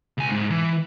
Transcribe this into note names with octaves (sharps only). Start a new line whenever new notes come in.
C#2 G#5
G#2
E3